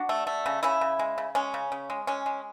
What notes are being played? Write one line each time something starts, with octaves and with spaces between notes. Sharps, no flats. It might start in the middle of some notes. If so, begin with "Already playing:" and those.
Already playing: D4 F#4
A3
A3
C#3
C#3 C#4 E4
C#3
G#3
C#3
G#3 C#4
C#3
C#3
G#3
G#3 C#4
G#3